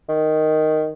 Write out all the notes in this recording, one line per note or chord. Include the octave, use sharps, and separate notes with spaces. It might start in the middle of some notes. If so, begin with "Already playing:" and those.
D#3